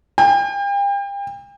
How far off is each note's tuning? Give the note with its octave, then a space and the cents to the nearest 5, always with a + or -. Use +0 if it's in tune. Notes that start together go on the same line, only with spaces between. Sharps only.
G5 +35